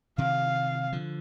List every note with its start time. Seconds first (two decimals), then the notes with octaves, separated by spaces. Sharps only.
0.18 C3 D#3 F5
0.92 D3 F3